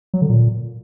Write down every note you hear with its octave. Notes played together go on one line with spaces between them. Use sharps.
F#3
D3
A#2